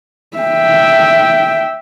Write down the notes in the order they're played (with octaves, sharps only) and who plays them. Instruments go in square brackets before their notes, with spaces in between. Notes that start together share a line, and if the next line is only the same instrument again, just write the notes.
[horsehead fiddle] E5 G5